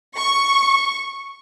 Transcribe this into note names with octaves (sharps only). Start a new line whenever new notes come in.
C#6